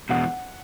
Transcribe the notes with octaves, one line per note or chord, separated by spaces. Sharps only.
E2 B2 G#3 F#5